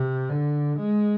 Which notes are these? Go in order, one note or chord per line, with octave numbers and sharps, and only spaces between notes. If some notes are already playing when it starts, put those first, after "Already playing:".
Already playing: C3
D3
G#3